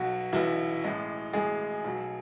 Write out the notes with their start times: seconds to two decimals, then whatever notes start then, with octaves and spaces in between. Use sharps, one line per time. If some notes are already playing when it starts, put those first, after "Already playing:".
Already playing: B1 B2 F#3 F#4
0.33 B1 B2 E3 F#3 E4
0.84 A1 A2 G#3
1.33 A1 A2 G#3 G#4
1.84 B1 B2 F#3